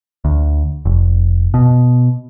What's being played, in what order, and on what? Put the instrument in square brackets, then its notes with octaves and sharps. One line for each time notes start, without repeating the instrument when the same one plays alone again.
[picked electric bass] D2
F1
B2